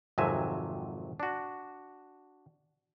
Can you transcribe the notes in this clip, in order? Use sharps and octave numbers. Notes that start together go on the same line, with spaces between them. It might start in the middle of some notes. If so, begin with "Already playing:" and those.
G#1 F2 C3 F#3 E5 G#5
D4 F#4